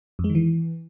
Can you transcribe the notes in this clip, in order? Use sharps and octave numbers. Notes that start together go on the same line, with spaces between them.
F2
G#3
D#3
E3